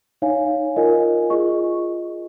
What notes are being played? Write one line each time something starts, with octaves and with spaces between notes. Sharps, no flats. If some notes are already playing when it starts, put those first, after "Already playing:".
D#4 C#5 F5 G#5
F4 A#4 D#5 G#5
F4 G#4 D#5 C#6